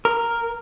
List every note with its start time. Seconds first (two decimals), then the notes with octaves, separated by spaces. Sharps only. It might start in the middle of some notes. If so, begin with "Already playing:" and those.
0.05 A#4